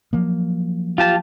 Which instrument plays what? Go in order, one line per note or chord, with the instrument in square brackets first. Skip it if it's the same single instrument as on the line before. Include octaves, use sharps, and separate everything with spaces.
[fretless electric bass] F3 F#3 A#3
[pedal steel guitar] F4 G4 A5